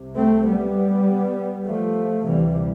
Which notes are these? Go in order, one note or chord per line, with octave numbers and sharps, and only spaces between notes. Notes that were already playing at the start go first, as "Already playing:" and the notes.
Already playing: C2 C3
A3 C4
G3 B3
F3 A3
D2 C3 E3 G3